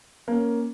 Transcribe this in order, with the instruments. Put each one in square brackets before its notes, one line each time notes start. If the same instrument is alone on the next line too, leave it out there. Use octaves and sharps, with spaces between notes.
[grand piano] A#3 C#4